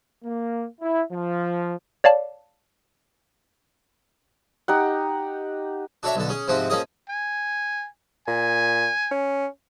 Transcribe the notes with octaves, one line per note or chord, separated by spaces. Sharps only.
A#3
E4
F3
C#5 D5 F5 A5
D#4 G4 F#5
D4 F#4 A4 C#5 E5
B1 D3 A4
C#4 G#4
G#2 C3 F3 C4 F#4
F3 A#3 C#4 G#4 D#5
G#5
A#2 G#5
C#4